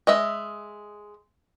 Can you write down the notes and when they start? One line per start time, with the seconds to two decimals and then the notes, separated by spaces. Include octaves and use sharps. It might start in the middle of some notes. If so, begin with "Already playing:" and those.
0.07 G#3 D#5 E5